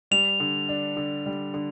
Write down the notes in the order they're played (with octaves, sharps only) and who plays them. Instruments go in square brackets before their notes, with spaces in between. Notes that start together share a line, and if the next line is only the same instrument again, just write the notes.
[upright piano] G3 [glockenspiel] F7
[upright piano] D3
D4
D3
G3
D3